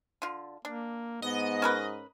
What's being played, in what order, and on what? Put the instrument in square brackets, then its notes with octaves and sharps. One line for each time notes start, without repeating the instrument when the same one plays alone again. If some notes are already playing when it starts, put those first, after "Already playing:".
[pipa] D3 F4
[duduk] A#3 [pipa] D4
[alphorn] G#2 [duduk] B3 [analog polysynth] D#5
[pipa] C#4 A#4 B4